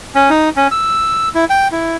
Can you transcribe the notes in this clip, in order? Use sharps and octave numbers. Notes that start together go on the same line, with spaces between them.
C#4
D#4
C#4
E6
E4
G5
E4